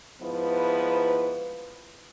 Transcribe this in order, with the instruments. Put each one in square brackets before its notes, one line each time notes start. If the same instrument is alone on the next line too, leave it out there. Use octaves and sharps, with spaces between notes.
[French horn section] G#2 F3 B3 E4 B4